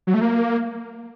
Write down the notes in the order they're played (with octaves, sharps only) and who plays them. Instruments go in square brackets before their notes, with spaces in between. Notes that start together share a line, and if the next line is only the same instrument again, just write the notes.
[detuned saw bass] F#3
A3
A#3